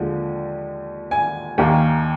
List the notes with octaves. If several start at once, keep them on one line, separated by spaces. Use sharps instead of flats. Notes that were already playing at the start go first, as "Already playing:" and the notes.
Already playing: D#2 D3 F3 G#3
G#5
D#2 D#3 A#3